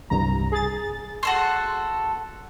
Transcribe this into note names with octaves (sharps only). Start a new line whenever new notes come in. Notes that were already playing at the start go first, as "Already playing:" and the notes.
C2 G2 A#5
G#4 A6
F#4 A4 C6